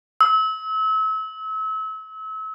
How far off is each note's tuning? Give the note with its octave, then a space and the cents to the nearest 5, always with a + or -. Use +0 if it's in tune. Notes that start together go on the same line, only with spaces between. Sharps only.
E6 -35